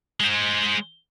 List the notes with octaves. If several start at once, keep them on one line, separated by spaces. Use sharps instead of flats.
G#3 C5